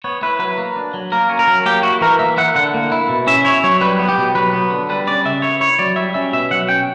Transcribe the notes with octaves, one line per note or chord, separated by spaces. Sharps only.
B3 C#5
E4 B4
F#3 B4
A#3
D4
F#3
A#3 A#4
C#4
A#4
F#3
A#3 G4
E4 F#4
E3 A#4
A#3 E5
E4 F#5
D3 F#5
A#3
E4
B2
C#4 E5
E4 C#5
F#3 C#5
G3 B4
B3
G4
B2
F#3 B4
B3
D3
G3 B4
C#4 D5
C#3 E5
B3 C#5
E4 C#5
F#3 D5
G3 E5
C#4 E5
B2 E5
F#3 F#5
C#4 G5